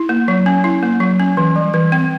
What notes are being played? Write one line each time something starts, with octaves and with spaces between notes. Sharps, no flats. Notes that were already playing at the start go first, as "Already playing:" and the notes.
Already playing: E4
A#3
F#3
C#4
E4
A#3
F#3
C#4
E3
G3
E3
C4